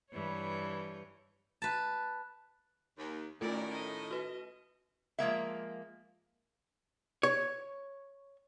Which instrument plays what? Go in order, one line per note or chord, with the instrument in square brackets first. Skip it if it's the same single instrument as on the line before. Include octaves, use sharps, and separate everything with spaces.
[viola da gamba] G2 E3 C#5
[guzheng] B4 A5
[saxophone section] D#2
[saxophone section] A2 D#3 [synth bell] A3 F4 A4 [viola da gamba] C#4 A#4 D5
[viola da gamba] D#5
[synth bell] F#4 B4
[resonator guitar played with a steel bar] F3 G#3 A#3 E5
[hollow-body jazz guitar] C#5